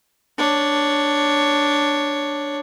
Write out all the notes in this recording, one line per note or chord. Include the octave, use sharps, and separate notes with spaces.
D4 C#5